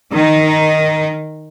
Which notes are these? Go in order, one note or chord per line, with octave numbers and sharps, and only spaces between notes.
D#3 D#4